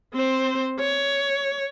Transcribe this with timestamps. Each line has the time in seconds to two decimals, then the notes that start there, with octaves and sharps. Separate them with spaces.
0.14 C4 C5
0.79 C#5